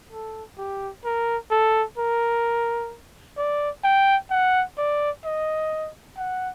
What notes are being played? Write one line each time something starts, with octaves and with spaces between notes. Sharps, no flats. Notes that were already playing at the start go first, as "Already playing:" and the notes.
A4
G4
A#4
A4
A#4
D5
G5
F#5
D5
D#5
F#5